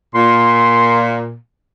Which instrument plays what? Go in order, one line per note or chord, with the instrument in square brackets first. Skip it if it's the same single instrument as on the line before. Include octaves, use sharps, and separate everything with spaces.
[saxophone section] A#2 [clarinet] C6